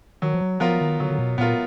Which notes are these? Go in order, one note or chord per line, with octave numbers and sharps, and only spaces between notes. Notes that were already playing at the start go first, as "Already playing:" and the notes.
D#3 F#3
F3
F#3
F3 B3 F4 A#4
D#3
D3 F#3
D3
B2
A#2 B3 F4 A#4